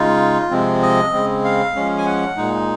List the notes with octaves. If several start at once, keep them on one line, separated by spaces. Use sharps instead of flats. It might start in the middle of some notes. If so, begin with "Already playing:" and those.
Already playing: C#3 G#3 D#4 F4
C3 F3 G#3 C4
D#5
C#3 G#3 C4
F5
F3 G#3 C#4
G#5
F#5
A#2 G#3 D#4